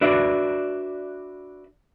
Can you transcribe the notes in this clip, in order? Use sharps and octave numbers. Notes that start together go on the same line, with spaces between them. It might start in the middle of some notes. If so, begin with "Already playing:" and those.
D4 F#4 B4 D5 E5